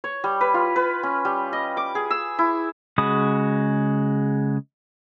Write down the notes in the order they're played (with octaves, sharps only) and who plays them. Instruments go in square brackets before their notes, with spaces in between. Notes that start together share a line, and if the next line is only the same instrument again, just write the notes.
[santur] C#5
G3
B4
F4
B4
C#4
G3
D#5
D6
G#4
E6
E4
[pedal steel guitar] C#3 G#3 F#4 B5 D#6